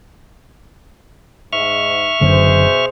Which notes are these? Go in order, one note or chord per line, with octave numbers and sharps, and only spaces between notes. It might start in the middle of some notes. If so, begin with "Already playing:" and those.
G#2 E5 C#6 F6
F#1 F#2 B2 D3 G#4 C5